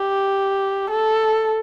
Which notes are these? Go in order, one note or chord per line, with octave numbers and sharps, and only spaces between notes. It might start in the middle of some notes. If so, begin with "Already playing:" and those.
Already playing: G4
A4